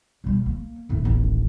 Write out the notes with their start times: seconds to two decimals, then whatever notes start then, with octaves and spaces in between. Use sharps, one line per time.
0.24 B2 G3
0.46 A#3
0.89 D#1 A2
1.04 D#1 A1